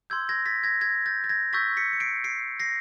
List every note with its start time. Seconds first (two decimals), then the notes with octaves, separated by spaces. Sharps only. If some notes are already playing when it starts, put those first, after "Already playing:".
0.10 C6 E6 G6 G#6
0.29 G#6 A#6
0.46 A6 B6
0.63 G#6 A#6
0.81 G#6 A#6
1.06 G6 A6
1.24 A6
1.29 G#6 A#6
1.53 C#6 E6 G6 A6 B6
1.77 B6 C#7
1.93 C#7
2.00 C7 D7
2.24 C7 D7
2.60 A#6 C7